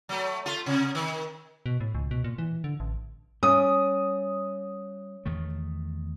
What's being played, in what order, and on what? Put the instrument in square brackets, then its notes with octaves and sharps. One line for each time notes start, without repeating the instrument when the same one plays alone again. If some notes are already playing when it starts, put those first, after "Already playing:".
[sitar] F#3 A3
A3 F4
C3
D#3
[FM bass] B2
A2
C#2
B2
A#2
E3
D3
A1
[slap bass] G3 [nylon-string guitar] C#4 [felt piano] D#6
[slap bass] E2 D#3 A3